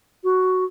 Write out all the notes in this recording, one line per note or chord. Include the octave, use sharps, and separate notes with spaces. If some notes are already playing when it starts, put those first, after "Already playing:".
F#4